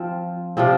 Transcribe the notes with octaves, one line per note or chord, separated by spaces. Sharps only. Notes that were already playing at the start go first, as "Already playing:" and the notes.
Already playing: F3 C4 F4
C3 F3 C4